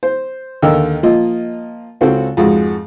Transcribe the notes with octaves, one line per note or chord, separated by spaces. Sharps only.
C5
D#2 D3 A#4 D#5 G5 E6
F3 A#3 F4 D#5
C#2 C4 F#4 A4
F2 G#2 G#3 F#4